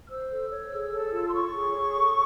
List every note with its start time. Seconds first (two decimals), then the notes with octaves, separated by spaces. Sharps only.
0.06 F6
0.09 C5 E6
0.30 A4
0.51 C#5
0.71 G#4
0.92 A4
1.13 F4
1.27 C6
1.33 C#5 C#6
1.54 G#4
1.75 C#5
1.95 A4